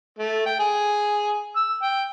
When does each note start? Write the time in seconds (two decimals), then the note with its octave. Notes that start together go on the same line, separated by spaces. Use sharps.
0.19 A3
0.46 G5
0.60 G#4
1.56 E6
1.83 G5